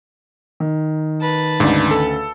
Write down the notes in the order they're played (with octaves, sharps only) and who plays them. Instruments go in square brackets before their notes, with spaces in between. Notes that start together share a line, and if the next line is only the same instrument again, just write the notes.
[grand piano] D#3
[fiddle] B4 A5
[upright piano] D2 C#3 D5 [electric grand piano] G#2
[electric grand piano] A4